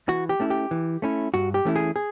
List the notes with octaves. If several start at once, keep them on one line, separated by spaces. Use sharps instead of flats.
E3 F#4
G4
A3 C#4 E4
G4
E3
A3 C#4 E4
G2 F#4
G4
E3 A3 C#4 E4
G#4
G#4